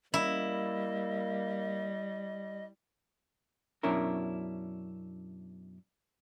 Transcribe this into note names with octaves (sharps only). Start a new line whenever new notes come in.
G3 A#3 E4 D#5
F#2 B2 C#4 D4 E4 A#4